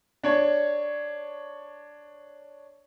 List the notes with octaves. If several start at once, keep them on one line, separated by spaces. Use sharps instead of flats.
D4 C#5